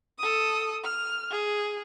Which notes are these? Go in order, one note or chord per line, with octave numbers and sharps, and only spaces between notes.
A4 D#6
F6
G#4